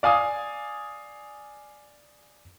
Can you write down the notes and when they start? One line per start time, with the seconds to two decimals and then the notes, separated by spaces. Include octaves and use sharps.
0.03 D5 F5 G#5 D#6